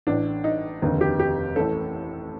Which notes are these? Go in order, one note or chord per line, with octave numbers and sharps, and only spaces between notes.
A1 A2 D4
D#4
F1 D#2 D3
G4
G4
A1 A2 A4